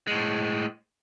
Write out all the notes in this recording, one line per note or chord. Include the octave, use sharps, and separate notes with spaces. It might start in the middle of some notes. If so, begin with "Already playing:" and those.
A2 G#3